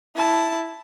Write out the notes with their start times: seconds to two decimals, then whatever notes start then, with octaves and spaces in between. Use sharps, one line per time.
0.16 E4 A5